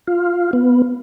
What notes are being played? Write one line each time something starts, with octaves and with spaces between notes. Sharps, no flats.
F4
B3